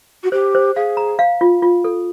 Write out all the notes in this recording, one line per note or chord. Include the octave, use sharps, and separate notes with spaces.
F#4
G4 C5
C5
G#4 F5
A#5
F5
F4
F4
A4